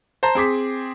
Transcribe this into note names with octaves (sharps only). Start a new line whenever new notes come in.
C5 A5 A#5
C4 G#4 D6 B6